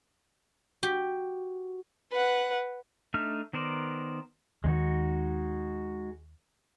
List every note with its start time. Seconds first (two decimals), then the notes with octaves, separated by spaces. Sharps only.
0.83 F#4 G4
2.12 B4 F#5
3.14 A3 D4 D#4 E5 F6
3.53 D#3 B3 A#4 C5 D5
4.64 D#2 D#3 G#3 D#4 F#4